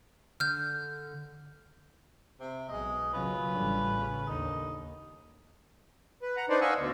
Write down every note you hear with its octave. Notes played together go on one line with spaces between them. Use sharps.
D3 F6 G6
C3
B1 B2 G#3 D#5
D#2 C#3 F#3 C#4 F4 B4
A1 D3 G3
C#3
D#2 D3 D#4
B4
F#5 A#5
D4 D#4 B4 C5 D5
D#5 F5 F#5 G#5 C#6 E6
D2 B2 D3